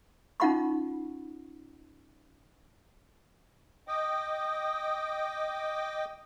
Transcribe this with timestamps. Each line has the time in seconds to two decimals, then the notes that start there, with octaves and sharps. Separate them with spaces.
0.40 C#4 D#4 F4 F#5 B5 C#6
3.88 D#5 G5 D6 D#6